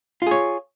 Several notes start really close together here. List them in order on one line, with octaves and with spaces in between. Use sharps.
F4 G#4 C#5